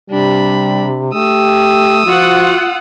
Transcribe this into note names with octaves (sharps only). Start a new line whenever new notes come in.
C3 G3 D4 B5
A3 G4 D#6 E6
F3 F4 F#4 F#5